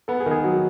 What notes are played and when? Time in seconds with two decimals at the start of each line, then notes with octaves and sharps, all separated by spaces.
0.08 B3 A4
0.20 G#4
0.26 D#3
0.32 G#4
0.44 F#3